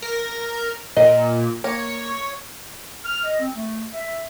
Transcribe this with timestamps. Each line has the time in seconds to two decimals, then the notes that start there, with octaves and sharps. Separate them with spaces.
0.02 A#4
0.97 A#2 D#5
1.64 A#3 C#5
3.05 F6
3.24 D#5
3.40 C4
3.55 A3
3.94 E5